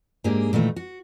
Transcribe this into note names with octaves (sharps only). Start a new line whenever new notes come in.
G#2 A#3 D4 G4 G#4
A#2 D#3 E3 A3
F#4